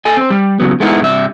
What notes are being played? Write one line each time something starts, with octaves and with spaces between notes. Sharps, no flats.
A4 D#5 G#5
C4 C5
G3
C#3 F#3 B3
G#3 A3 B3 D#4 E4 A#4
G2 C3 E5